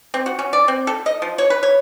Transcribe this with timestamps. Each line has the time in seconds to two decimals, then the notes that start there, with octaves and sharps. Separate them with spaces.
0.14 C4
0.26 F#4
0.39 C#4
0.53 D5
0.68 C4
0.87 A4
1.06 D#5
1.22 F3
1.38 C#5
1.50 B4
1.63 C#5